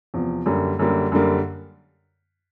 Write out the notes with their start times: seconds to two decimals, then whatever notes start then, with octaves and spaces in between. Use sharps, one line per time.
0.14 E2 C3 F3
0.46 F#2 D3 G3 A#3
0.79 F#2 D3 G3 A#3
1.12 F#2 D3 G3 A#3